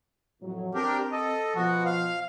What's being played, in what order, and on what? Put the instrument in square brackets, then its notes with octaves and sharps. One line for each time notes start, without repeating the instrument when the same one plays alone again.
[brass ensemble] F2 A2 F#3
[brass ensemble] C4 [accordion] D4 G4 A#4
[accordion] A4 D#5
[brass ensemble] B2 F3 [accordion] B3 F#4
[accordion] F5